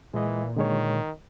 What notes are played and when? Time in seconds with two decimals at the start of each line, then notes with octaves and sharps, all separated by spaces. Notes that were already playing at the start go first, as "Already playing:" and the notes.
0.14 A#2 E3 G#3 D#5
0.57 D3 D#3 G#3 C#5